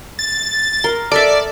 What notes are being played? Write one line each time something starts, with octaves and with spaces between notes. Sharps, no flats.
A6
A#4 C6
A4 A#4 D5 E5